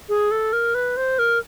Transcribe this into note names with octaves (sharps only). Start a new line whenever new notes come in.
G#4
A4
A#4
B4
C5
A#4